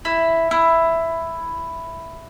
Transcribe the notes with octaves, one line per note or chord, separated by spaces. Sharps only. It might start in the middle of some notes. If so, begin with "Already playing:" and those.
E4
E4